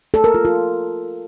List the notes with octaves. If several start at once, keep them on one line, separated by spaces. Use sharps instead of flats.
A4
A#4
F4
F4